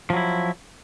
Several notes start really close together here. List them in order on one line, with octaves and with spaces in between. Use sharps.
F3 F#3 E4